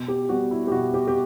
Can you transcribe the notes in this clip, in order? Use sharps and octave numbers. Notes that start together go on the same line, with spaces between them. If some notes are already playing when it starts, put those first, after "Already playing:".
Already playing: B2
G4
G3 B3 F#4
E4
G4
B2 F#4
G4
G4